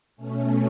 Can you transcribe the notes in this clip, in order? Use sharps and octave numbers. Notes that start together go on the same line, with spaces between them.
B2 A3 C#4